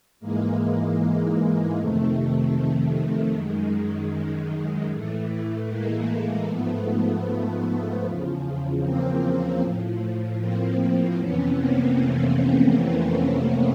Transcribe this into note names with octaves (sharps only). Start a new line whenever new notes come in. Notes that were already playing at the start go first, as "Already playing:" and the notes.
G#2 E3 G#3 A#3
F2 C3 D#3 A3
F#2 D#3 G#3
A2 E3 A3
G#3 A#3
G#3 A#3
G#2 F3 A3 B3
E2 C#3 F3
A#3 C4
A2 F3
A#3 C4
F2 C3 E3 B3 C#4
A#3 C4
A3